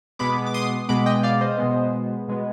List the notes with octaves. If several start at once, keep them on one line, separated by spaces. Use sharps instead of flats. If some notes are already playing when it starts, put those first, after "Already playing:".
B2 G#3 B3 B5 D6
D6
C6 D#6
B2 G#3 B3 B5 D6
D#5 G5
D5 F5
C5 D#5
B2 G#3 B3
B2 G#3 B3